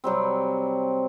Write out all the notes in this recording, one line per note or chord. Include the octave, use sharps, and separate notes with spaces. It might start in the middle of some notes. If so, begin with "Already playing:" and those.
C3 F#3 G3 C4